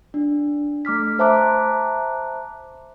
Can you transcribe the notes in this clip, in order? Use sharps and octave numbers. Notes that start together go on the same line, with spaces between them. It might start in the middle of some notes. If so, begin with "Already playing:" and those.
D4
A3 D6 F6 B6
C5 E5 A5 A#5 D6 F#6